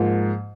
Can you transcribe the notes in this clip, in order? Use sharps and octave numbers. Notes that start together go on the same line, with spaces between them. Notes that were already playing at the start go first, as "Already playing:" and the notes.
Already playing: G#2 F3 A#3